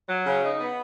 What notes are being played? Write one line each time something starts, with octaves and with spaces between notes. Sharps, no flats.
F#3
C#3
D#4
B3